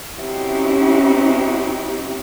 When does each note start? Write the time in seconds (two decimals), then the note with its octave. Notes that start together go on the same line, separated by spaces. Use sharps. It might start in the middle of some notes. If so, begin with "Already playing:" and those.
0.16 C4 C#4 D#4 E4 F#4 G4